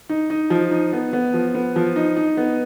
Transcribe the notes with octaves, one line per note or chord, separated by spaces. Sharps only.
D#4
D#4
F3
D#4
B3
B3
F3
B3
F3
D#4
D#4
B3